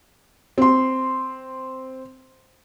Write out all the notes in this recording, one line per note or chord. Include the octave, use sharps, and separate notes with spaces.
C4 C6